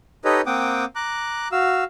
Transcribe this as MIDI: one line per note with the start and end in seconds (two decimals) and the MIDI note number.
0.25 0.41 63
0.25 0.41 67
0.25 0.41 69
0.25 0.41 71
0.25 0.41 73
0.25 0.41 75
0.46 0.85 58
0.46 0.85 60
0.46 0.85 78
0.46 0.85 79
0.46 0.85 86
0.46 0.85 87
0.95 1.48 82
0.95 1.48 86
0.95 1.48 90
1.52 1.84 66
1.52 1.84 77
1.52 1.84 88